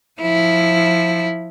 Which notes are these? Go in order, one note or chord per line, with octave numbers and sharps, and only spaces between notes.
F3 E4